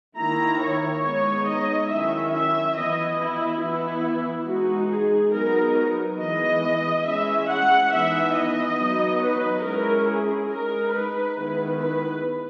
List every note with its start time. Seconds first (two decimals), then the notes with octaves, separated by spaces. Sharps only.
0.18 D#3 A#3 E4 A#5
0.61 C#5
1.03 G#3 B3 D#4 C#5
1.47 D#5
1.89 D#3 F#3 C#4 E4 E5
2.33 E5
2.76 E3 B3 E4 D#5
3.20 E4
3.62 E3 B3 E4
4.47 G#3 D#4 F#4
4.91 G#4
5.34 F#3 B3 D#4 A#4
6.20 E3 G#3 B3 E4 D#5
7.06 G#3 C#4 E4 E5
7.49 F#5
7.92 E3 B3 D#4 E5
8.36 D#5
8.78 F#3 B3 D#4
9.21 B4
9.64 G#3 C#4 E4 A#4
10.08 G#4
10.50 G#3 D#4 A#4
10.93 B4
11.36 D#3 G#3 B3 E4
11.79 B4